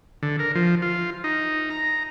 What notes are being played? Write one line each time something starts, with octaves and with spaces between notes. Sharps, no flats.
D3
A#4
F3
F4
D#4
A#5